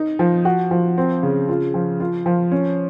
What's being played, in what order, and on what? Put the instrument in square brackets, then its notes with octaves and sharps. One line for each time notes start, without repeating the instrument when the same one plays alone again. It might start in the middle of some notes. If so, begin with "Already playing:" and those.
Already playing: [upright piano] D#4
F3
F#4
F3
C4
C#3
F4
F3
F4
F3
C#4